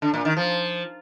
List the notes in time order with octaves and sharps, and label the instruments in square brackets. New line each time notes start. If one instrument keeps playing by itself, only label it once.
[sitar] D3
A#2
D#3
F3